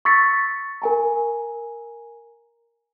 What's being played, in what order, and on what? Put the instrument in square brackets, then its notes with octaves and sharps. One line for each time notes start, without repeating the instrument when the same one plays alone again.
[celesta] C#6 E6 A6 B6 C#7
A#4 G#5 A#5